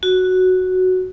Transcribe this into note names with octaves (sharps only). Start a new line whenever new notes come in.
F#4